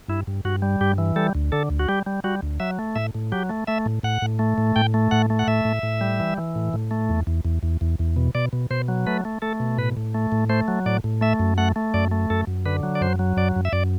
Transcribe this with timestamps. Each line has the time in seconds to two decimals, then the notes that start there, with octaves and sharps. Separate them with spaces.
0.08 G2 E4
0.27 G2
0.45 G2 F#4
0.62 G3
0.81 G2 G4
0.98 E3
1.16 G3 A4
1.35 D2
1.52 D3 A4
1.70 D2
1.79 F#4
1.89 G3 G4
2.06 G3
2.24 G3 F#4
2.42 D2
2.60 F#3 E5
2.79 A3
2.96 A2 E5
3.15 A2
3.32 F#3 G4
3.49 A3
3.67 A3 E5
3.86 A2
4.03 A2 F#5
4.22 A2
4.39 A3
4.58 A2
4.76 A2 G5
4.94 A3
5.11 A2 F#5
5.30 A3
5.39 F#5
5.47 A2 E5
5.65 A2
5.83 A2
6.01 G3
6.20 E3
6.38 E3
6.55 A2
6.73 A2
6.91 A3
7.09 E2
7.27 E2
7.45 E2
7.63 E2
7.81 E2
7.99 E2
8.16 B2
8.35 B2 D5
8.53 B2
8.70 B2 C5
8.88 F#3
9.07 A3 B4
9.25 A3
9.42 A3 A4
9.60 B2
9.78 A2 B4
9.97 A2
10.14 A3
10.32 A2
10.49 A3 C5
10.68 F#3
10.86 A2 D5
11.04 A2
11.21 A3 E5
11.39 F#2
11.58 A3 F#5
11.76 A3
11.94 F#2 D5
12.11 A3
12.30 F#2 A4
12.47 F#2
12.66 D3 B4
12.83 F#3
12.95 D5
13.01 F#2 C5
13.19 F#3
13.37 F#2 D5
13.56 F#2
13.65 E5
13.73 F#2 D5